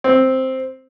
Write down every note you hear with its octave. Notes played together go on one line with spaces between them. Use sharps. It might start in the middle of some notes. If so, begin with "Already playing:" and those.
C4